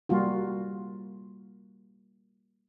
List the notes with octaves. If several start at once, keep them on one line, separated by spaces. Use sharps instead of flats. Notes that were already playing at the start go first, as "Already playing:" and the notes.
G3 A#3 F4 F#4